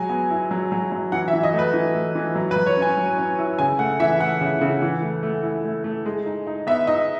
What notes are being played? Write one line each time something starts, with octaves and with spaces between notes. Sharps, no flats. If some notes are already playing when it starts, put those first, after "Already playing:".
Already playing: F#3 G#3 G#5
B3
E4
F#3
F#3
F#3
E3 F#5
E5
E3
D#5
A3
B4
E3
A3
E3
F#3
B4
F#3
C#5
C#4
G#5
F#3
C#4
E4
C#3 G#5
A3 F#5
E3 E5
A3 F#5
C#3
C#3
E3
A3
A3
E4
A3
A3
G#3
D#4
D#4
B3 E5
D#4 D#5